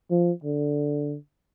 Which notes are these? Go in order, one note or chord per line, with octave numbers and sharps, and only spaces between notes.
F3
D3